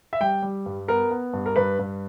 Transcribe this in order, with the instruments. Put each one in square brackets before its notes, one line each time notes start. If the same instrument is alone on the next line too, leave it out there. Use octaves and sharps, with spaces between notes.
[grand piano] E5
G3 G5
G3
G2
B3 A#4
B3
G2
A#4
G2 B4
G2